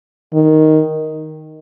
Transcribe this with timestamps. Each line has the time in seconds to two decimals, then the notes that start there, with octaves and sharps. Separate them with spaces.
0.34 D#3